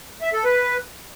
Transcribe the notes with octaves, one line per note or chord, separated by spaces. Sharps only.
E5
A4
B4